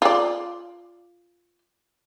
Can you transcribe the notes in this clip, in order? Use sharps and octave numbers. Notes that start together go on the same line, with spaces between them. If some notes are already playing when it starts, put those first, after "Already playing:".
F4 D5